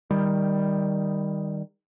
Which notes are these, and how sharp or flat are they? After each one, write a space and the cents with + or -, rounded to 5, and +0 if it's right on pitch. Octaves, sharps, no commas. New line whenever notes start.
D#3 +0 G3 +10